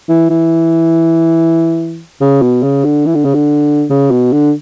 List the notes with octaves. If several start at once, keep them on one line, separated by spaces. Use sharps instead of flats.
E3
E3
C#3
B2
C#3
D3
E3
D3
C#3
D3
C#3
B2
D3